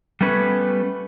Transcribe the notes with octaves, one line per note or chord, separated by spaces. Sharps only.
G3 A3 B3 C#4 B4